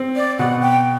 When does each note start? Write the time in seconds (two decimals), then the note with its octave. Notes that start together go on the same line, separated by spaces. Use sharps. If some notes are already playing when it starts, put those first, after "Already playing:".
Already playing: C4
0.16 D5
0.39 B2 F#5
0.61 G5